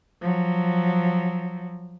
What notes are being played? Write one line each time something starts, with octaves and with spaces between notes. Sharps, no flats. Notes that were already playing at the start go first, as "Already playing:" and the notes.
F3 F#3